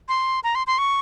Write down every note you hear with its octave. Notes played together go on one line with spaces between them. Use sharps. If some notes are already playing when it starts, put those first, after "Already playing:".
C6
A#5
C6
C6
C#6